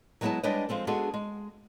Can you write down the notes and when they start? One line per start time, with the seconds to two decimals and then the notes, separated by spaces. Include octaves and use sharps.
0.21 F#3 G#3 B3 E4 G#4 A5
0.43 G3 G#3 D4 B4 C#5 D#5
0.69 F3 G#3 C4 A4
0.87 G#3 B3 D4 F#4 G#4 A4
1.14 G#3